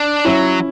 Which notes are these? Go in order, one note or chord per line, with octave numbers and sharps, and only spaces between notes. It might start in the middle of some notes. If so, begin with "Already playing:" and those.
Already playing: D4
F#3 C#4 E4